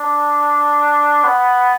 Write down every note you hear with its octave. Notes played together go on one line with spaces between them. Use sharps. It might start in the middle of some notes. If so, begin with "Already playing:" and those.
Already playing: D4
B3